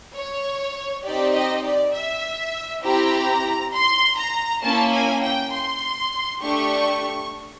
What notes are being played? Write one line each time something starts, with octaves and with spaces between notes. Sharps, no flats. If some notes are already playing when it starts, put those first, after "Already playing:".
C#5
C4 D#4 G4 D5
D#5
D5
E5
C4 E4 G4 A#5
C6
A#5
A#3 C#4 E4 A5
G#5
G5
C6
A3 D4 G4 C#6